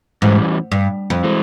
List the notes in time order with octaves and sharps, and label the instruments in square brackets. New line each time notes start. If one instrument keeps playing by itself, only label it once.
[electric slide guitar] E2 E3 G3 C#4 [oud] G#2
[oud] G2
F2
[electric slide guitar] E3 G#3